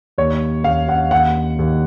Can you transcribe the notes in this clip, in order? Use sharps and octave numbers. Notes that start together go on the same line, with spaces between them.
D#2 C#5
D#2 F5
F#5
D#2 F#5
D#2